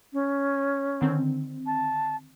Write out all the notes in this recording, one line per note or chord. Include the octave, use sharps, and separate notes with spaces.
C#4
D3 D#3 C4
A5